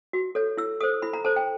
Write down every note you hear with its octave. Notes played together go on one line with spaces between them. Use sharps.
F#4
A4 C#5
E4 E6
A4 C5 D#6
E4 B5
A#5
A4 C5 A5
G5